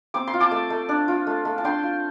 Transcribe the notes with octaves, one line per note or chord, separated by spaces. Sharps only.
C4 D6
C6
F4
A5 D6
A3
A3
D4
F4
A3
A3
A5
D4 G5 C6
F4